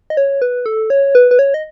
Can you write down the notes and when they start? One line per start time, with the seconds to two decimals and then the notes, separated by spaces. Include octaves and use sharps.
0.10 D#5
0.17 C#5
0.42 B4
0.66 A4
0.90 C#5
1.15 B4
1.31 B4
1.39 C#5
1.54 D#5